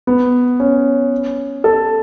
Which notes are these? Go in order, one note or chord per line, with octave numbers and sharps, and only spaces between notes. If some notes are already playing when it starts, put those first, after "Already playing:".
B3
C#4
A4